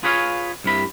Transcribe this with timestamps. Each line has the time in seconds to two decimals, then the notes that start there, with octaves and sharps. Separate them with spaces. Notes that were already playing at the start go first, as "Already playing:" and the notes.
0.03 F4 G#4 B4 C#5 D#5 F5
0.64 C2 G2 C3 B5